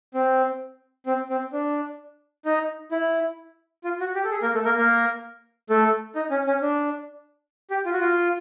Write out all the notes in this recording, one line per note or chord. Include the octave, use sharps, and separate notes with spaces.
C4
C4
C4
D4
D#4
E4
F4
F#4
G4
A4
G#4
A#3 A#4
A3 A4
A#3 A#4
A#3 A#4
A3 A4
D#4
C#4
C#4
D4
G4
F4
F#4
F4